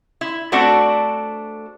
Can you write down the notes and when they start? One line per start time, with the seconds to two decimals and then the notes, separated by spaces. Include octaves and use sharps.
0.21 E4
0.52 A3 C4 D4 F#4 A4